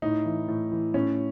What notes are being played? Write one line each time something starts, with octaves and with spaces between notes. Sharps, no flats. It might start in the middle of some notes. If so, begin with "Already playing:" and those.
A2 D#4
E3
A2
E3
A2 C#4